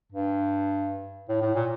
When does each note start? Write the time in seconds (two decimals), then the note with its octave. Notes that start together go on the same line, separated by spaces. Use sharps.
0.12 G2
1.29 A2
1.41 A2
1.55 A#2